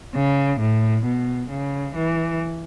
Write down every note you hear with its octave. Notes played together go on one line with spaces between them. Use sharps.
C#3
A2
B2
C#3
E3